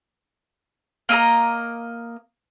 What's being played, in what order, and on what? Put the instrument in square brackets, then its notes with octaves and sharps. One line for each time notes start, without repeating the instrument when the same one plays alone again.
[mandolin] A#3 D#5 E5 A#5